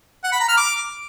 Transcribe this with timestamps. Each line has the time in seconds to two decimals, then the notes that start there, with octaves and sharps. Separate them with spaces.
0.24 F#5
0.32 B5
0.40 A#5
0.49 F6
0.57 D6